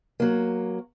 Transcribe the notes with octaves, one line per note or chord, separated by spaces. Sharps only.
F#3 A#3